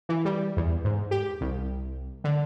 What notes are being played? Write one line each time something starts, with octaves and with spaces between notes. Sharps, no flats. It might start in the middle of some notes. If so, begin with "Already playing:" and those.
E3
G3
E2
G#2
G4
C2
D3